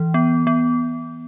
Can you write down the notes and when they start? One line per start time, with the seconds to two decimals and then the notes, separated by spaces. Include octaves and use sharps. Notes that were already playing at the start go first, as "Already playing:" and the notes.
Already playing: E3
0.14 B3
0.47 B3